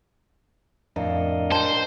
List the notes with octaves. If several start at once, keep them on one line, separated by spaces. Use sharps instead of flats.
F2 A2 D4 A#4 D#5
C5 G5 A5